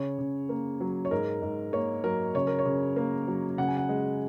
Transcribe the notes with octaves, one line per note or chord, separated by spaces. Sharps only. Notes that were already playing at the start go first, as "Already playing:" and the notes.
Already playing: C#3 C#5
C#3
A#3
F#3
C#5
G#2 A#4
G#2
A#3 C#5
F#3 A#4
C#3 C#5
A#4
C#5
C#3
A#3
F#3
C#3 F#5
G#5
F#5
G#3